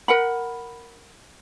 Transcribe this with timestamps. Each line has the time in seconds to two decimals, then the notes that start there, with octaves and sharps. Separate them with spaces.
0.08 A#4 F#5 B5